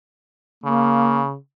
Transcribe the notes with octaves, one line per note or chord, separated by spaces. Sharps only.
C#3 A#3